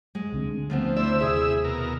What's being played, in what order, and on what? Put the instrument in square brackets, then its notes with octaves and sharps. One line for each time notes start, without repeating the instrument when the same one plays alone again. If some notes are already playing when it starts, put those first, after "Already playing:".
[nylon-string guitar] G#3
[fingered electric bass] C#2 D3 C4
[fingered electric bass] D2 [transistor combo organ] F3 [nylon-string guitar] A3 B3 C4
[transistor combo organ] E4 E6 [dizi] C5 [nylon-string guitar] D5
[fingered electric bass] D#2 C3 [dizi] G#4 [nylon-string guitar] E5
[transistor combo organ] B2 A#4